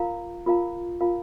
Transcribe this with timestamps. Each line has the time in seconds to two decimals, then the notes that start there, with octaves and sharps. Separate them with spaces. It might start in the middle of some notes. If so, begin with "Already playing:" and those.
Already playing: F4 A#4 F5 A#5
0.46 F4 A#4 F5 A#5
1.01 F4 A#4 F5 A#5